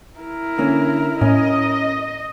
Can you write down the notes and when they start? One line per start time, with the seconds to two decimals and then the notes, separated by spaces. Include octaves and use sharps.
0.19 E4 A#4
0.58 D3 A#3 C#4
1.21 A2 C#4 D#5